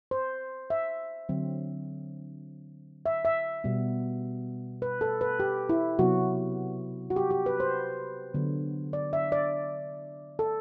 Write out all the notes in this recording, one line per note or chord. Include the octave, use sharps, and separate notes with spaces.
C5
E5
D3 F#3 C4
E5
E5
B2 G3 B3
B4
A4
B4
G4
E4
C3 F#3 B3 F#4
F#4
G4
G4
B4
C5
D3 F#3 B3
D5
E5
D5
A4